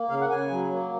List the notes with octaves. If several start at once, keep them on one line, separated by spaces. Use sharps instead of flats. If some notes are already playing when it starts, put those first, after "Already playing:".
Already playing: A#3
C#3 F5
F#5
C#3 G#5
F#3
A#3